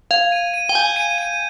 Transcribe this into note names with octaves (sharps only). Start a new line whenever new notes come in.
F5 G#6
D#7
D#7
G5
G#5 G6
D#7
D#7